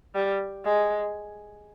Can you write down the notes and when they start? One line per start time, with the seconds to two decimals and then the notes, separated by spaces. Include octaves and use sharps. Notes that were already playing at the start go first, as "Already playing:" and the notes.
0.15 G3
0.65 G#3